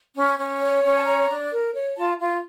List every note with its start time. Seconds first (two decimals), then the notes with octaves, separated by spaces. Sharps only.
0.15 C#4
0.38 C#4
0.60 C#5
0.84 C#4
0.96 A5
1.06 C#5 A#5
1.29 D4
1.51 A#4
1.74 C#5
1.96 F4 A5
2.18 F4